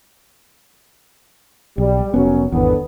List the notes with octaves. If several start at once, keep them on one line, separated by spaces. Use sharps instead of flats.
B1 G3
F1 F#2 F#3 B3 C#4
G#1 E2 D3 B3